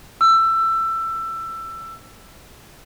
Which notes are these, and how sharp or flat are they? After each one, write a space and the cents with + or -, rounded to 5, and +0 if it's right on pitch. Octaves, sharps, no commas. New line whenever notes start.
E6 +20